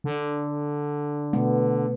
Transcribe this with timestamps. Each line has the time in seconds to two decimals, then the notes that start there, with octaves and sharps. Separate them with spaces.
0.04 D3
1.33 B2 A3 B3